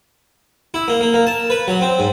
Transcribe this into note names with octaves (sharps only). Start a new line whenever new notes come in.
E4
A#3
A#3
A#3
A5
B4
F#3
C4
G#2